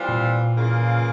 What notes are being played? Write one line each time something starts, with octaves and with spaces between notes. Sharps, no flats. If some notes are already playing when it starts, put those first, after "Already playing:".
Already playing: E3 G3 C4 F4
A#2
C#3 E3 A#3 F4